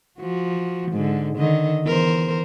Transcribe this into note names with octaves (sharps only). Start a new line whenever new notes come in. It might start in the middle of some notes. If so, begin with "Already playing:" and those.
F3 F#4
G#2 D3
D3 D#3 D#5
E2 A#4 C5